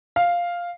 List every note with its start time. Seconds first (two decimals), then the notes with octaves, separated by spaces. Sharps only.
0.16 F5